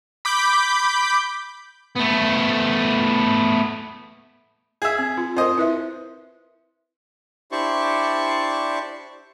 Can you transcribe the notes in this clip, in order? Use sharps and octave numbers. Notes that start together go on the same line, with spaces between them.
B5 D6 G6
A3 B3
G#4 E5
C4
F4
C4 A#4 C5 D#5
E4 B4 E5
D4 E4 G4 C5 D5 C#6